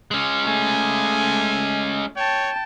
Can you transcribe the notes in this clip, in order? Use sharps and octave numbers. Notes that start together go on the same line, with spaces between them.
G#3 C#4
A3 G#5
C#5 G5 A5